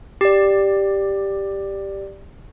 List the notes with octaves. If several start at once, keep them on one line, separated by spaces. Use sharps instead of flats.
G4 D5